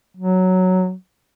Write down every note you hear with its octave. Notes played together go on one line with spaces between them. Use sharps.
F#3